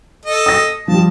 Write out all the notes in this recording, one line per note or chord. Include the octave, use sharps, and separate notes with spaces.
A4 D#5
D#6 A#6
F3 G3 A5